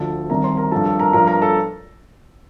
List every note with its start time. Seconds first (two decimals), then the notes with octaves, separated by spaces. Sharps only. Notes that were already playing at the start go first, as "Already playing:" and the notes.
Already playing: D2 D3 F3 A4 A5
0.29 C2 C3 D#3 G3 A#4 A#5
0.43 C5 C6
0.57 A#4 A#5
0.72 G2 F3 A4 A5
0.85 A4 A5
1.00 A#4 A#5
1.13 G2 F3 A#4 A#5
1.28 A#4 A#5
1.42 A4 A5